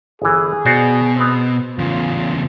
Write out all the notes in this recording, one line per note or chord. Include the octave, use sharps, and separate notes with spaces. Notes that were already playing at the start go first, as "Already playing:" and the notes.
G1 E3 G#4
B2 F#4 C5 D5
B3 C4
E2 C#3 F4